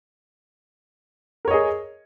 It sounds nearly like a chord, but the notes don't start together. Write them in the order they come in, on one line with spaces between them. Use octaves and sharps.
A#4 C#5 D#5 G#4